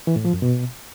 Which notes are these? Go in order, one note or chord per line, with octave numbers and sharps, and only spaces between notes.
E3
A2
F3
F#2
B2